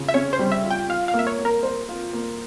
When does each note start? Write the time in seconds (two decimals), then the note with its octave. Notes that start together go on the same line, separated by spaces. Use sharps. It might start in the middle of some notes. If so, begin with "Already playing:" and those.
Already playing: C#3 F4
0.09 E5
0.14 C#4 C#5
0.33 C5
0.39 G3
0.52 E5
0.64 F4
0.71 G5
0.89 F4 F5
1.08 F5
1.14 A#3
1.19 E5
1.27 C#5
1.39 A#3
1.45 A#4
1.63 C5
1.89 F4
2.13 A#3